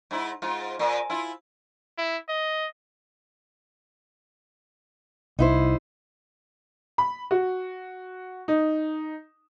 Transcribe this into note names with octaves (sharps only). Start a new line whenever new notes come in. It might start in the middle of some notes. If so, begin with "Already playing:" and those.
G#2 E4
G#2 F4
A#2
E4 F4
E4
D#5
C2 D#4 E4 C5
B5
F#4
D#4